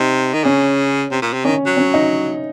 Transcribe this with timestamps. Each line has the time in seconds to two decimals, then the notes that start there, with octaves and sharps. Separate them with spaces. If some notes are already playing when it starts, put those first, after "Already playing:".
Already playing: C3 D#4
0.34 D#3
0.44 C#3 C#4
1.11 C3
1.22 A#2
1.33 C3
1.45 D#3 C#4
1.66 F#3
1.77 C#4
1.94 D#4